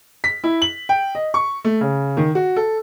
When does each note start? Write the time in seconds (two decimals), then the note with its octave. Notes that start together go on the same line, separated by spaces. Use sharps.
0.24 B6
0.44 E4
0.62 F#7
0.89 G5
1.15 D#5
1.34 C#6
1.65 A3
1.81 C#3
2.17 D#3
2.35 F#4
2.56 A4